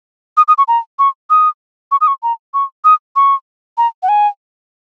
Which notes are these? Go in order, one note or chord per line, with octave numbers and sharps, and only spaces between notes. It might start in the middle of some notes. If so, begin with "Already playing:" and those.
D#6
D#6
C#6
A#5
C#6
D#6
C#6
D#6
C#6
A#5
C#6
D#6
C#6
A#5
F#5
G#5